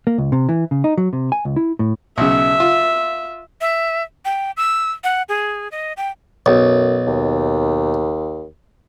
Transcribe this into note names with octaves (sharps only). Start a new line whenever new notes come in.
A#3
C#2
C3
E3
C#3
D#4
F#3
C3
G#5
C#2
E4
A2
B1 C#3 E5
F4
E5
G5
E6
F#5
G#4
D#5
G5
B1 F#2
D#2